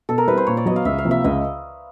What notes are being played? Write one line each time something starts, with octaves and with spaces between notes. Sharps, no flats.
B2 A4
A#4
G3 C4 E4 B4
C5
A#2 C#5
D5
F#3 B3 D#5
F5
C#2 E5
F5
C3 F3 A#3
E5
C#2 D#5